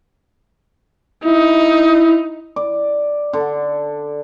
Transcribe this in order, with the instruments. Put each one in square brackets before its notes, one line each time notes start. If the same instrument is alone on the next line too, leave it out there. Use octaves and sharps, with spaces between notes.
[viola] D#4 [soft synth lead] E4
[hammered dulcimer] D5
D3